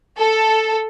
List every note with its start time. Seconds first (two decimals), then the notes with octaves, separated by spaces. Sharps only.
0.18 A4